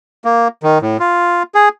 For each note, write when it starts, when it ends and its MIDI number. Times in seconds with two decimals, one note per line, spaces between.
0.25 0.48 58
0.63 0.78 51
0.82 0.97 45
1.00 1.43 65
1.55 1.69 68